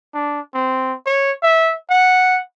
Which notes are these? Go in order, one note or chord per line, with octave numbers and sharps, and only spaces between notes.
D4
C4
C#5
E5
F#5